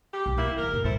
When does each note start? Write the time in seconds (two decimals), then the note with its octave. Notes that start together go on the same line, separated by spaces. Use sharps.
0.12 G4
0.26 B1
0.37 A#3 C4 E4
0.57 E3 A#4
0.71 F#2 A#2
0.84 G2 E4 A4 C5